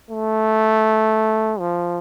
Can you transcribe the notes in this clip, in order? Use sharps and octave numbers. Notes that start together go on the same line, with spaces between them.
A3
F3